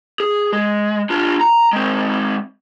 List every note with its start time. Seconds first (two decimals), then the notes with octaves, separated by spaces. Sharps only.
0.20 G#4
0.53 G#3
1.10 D4 F4
1.41 A#5
1.73 G#3 C4